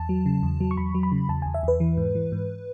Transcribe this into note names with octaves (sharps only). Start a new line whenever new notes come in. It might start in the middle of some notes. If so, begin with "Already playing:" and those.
Already playing: E2 A5
F#3
C#3
E2
F#3
C#6
E2 B5
F#3
B5
C#3
E2 A5
E2 G#5
E5
E2 B4
E3
G#2
E3
G#2